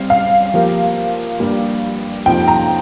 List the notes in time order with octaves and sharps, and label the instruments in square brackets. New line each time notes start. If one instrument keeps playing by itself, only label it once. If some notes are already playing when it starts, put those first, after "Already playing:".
Already playing: [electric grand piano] G3 C4 G4 [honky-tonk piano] F5
[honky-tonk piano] F5
[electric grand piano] F3 A#3 G4 A#4
G2 G3 A#3 G4
[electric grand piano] F2 C3 F3 A#3 D#4 [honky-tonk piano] G5
[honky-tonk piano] A#5